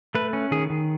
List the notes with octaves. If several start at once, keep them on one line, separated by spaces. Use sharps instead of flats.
A3 B4
C#4
D#3 G#4
D#3